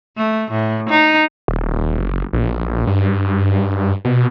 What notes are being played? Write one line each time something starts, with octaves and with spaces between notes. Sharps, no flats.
A3
A2
D#4
D#1
F#1
A#1
G2
B2